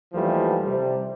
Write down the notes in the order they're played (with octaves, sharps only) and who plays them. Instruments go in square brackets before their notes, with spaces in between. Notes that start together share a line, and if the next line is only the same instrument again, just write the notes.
[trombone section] D#2 E3 F3 G3 A3
C3 G3